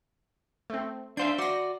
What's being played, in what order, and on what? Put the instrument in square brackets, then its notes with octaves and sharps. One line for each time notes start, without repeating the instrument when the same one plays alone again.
[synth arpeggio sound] A3 C4
[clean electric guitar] D4 C5 [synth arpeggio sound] E5 F5 G6
[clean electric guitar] F#4 D5 [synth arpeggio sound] C6 A#6